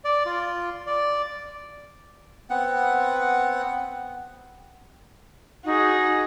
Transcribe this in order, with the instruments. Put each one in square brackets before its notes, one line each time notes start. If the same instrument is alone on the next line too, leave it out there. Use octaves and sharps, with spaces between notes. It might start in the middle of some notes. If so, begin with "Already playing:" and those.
[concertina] D5
F4
D5
[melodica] B3 C4 F#5
[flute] D#4 [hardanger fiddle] F#4 G#4